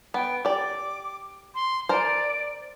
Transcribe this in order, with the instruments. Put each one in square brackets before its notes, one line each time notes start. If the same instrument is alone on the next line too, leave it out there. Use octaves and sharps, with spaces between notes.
[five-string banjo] B3 [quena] G5
[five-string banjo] G4 D5 [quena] D6
[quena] C6
[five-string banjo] A#4 C5 [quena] D5